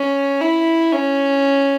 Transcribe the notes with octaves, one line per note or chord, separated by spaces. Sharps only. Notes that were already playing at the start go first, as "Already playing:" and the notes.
Already playing: C#4
E4
C#4